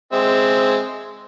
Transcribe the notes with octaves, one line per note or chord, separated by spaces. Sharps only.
G#3 C4 E5